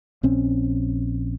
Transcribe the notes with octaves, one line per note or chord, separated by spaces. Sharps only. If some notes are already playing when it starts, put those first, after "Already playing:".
A#1 C4 C#4